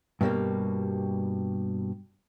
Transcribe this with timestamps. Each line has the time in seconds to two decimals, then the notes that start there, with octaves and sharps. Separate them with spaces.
0.21 G2 B2 E3 G3 A#3